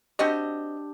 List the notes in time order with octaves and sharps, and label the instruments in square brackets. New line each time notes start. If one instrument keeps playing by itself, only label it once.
[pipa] C4 F#4 D#5 [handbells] D4 G4